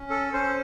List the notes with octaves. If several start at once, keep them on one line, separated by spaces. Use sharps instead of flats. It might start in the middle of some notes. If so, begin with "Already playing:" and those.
Already playing: C#4
A4
C#4 C5